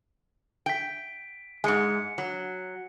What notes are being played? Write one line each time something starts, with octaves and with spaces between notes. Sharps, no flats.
G5 B6 D7
G#2 G#3 G#5 C#7
F#3